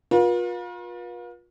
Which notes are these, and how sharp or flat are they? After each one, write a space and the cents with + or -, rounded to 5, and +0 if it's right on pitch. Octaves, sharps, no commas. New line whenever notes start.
F4 +35 B4 -45